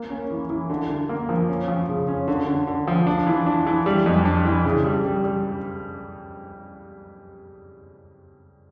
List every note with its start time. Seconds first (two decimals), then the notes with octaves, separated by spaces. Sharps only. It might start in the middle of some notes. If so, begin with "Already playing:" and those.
Already playing: A#3
0.10 C#4
0.30 E3
0.50 E3
0.70 D3
0.90 D3
1.09 A#3
1.29 F3
1.49 C#4
1.68 F3
1.89 C#3
2.08 C#4
2.28 D3
2.47 D3
2.67 D3
2.88 F3
3.07 D4
3.27 E3
3.46 D4
3.66 E3
3.86 G3
4.06 F2
4.25 D4
4.45 E3
4.65 C#3
4.84 G3
5.05 G3
5.24 G3